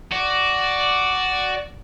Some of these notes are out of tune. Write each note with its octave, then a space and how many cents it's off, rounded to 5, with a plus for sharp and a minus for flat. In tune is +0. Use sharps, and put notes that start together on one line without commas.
F#4 +10 D5 +0